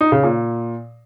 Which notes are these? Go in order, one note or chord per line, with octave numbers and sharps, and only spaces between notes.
D#4
C#3
A#2